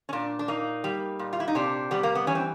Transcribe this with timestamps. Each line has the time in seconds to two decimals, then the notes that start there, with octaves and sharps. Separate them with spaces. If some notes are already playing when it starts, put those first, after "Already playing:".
0.09 C#4
0.13 A#2 D4
0.39 D4
0.48 A#3 D#4
0.84 G3
1.19 A#2
1.33 F4
1.40 E4
1.48 D#4
1.55 C3 D4
1.91 G3 B3
2.03 A#3
2.15 B3
2.27 E3 C#4
2.35 C4